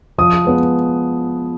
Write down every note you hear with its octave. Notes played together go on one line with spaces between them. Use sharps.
F3 D#6
G#3 B3